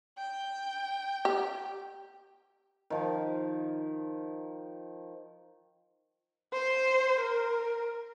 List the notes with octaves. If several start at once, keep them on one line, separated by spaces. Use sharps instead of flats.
G5
G4
D#3 F3
C5
A#4